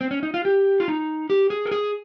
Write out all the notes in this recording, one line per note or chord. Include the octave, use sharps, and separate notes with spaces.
C4
C#4
D#4
F4
G4
F4
D#4
G4
G#4
A#4
G#4